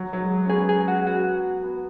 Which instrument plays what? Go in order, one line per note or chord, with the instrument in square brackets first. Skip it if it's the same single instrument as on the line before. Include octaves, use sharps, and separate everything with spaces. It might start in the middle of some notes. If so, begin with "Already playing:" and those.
Already playing: [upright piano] F#3
F#3
G#3
C#4
[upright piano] B3 [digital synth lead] G#4
[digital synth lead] G#4
F#4
[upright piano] B3 [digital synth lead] F#4
[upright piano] B3